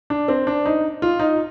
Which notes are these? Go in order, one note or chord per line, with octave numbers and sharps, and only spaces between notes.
D4
C4
D4
D#4
F4
D#4